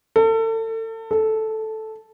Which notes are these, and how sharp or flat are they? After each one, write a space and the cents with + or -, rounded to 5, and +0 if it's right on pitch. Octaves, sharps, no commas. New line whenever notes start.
A4 +35
A4 -5